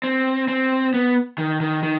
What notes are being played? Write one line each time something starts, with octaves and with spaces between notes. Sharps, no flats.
C4
C4
B3
D#3
D#3
D#3